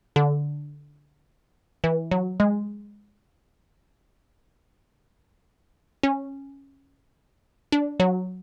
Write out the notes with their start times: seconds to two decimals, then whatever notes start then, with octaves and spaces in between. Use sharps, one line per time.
0.16 D3
1.84 E3
2.11 F#3
2.40 G#3
6.03 C#4
7.72 D4
8.00 F#3